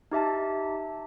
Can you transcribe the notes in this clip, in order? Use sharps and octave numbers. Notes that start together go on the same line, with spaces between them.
D#4 G4 E5 A5